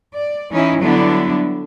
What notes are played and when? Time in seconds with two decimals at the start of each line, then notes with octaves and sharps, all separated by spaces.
0.14 D5
0.50 E3 C#4 D#4 E4
0.80 D3 F#3 G3 B3 D4 E4